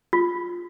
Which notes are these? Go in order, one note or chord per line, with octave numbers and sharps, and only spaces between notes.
F4